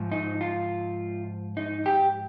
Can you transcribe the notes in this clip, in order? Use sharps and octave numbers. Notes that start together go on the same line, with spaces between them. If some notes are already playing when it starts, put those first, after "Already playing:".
Already playing: G#2 F3
D#4
F4
D#4
G4